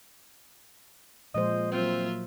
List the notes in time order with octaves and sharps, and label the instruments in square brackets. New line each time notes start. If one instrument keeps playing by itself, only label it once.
[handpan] A#2 F3 C5 [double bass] G#3 [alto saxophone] D#5
[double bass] F#3 A#3 [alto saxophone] C4 [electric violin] F4 E5